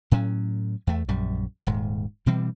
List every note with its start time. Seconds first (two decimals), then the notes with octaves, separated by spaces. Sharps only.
0.11 A2 F#3 C#4
0.87 E2 A3
1.09 A#1 F#2 G3
1.67 D#1 G#2
2.26 B2 E3 G3 C4